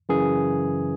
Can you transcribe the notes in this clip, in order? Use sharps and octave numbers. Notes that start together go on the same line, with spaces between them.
F#2 C#3 E3 G#4